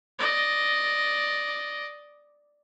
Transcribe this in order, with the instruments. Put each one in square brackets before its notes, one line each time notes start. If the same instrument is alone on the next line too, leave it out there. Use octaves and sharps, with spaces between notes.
[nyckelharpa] D5 D#5